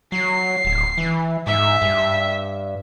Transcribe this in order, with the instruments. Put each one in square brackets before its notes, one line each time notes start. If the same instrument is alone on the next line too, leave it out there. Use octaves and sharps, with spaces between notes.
[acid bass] F#3 [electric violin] C7
[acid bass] D1
E3
[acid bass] G#2 [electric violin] E5
[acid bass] G2